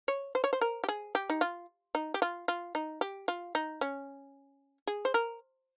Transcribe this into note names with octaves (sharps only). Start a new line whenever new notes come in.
C#5
C5
C#5
C5
A#4
G4
G#4
G4
D#4
F4
D#4
G4
F4
F4
D#4
G4
F4
D#4
C#4
G#4
C5
A#4